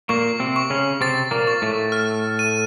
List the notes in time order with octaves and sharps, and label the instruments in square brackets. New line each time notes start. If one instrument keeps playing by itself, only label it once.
[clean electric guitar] A#2 A#3 [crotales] C#6
[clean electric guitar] C3 C4
[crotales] C#6
[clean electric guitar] C#3 C#4
[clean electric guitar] C3 C4 [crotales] A6
[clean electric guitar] A#2 A#3
[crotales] C#6
[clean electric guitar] A2 A3
[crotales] F6
D#7